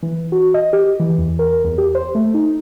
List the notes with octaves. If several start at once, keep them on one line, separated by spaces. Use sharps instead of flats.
E3
F#4
D#5
G4
E3
E2
A#4
E2
G4
C5
A3
D#4